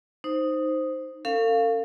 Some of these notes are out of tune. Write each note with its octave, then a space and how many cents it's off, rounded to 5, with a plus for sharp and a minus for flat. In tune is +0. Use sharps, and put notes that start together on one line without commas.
D#4 +0 C5 +0
C#4 +0 A4 +45 F5 +0